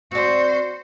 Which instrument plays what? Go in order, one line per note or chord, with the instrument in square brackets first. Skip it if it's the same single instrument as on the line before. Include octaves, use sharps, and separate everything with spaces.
[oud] C4 D5 [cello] F#4 C5